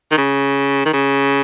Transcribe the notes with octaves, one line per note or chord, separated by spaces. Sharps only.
D#3
C#3
D#3
C#3